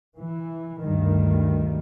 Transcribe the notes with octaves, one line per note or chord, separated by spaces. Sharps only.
E3
D2 G2 D#3 G3